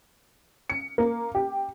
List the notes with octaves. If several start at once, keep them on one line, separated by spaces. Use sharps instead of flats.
C#7
A#3
G4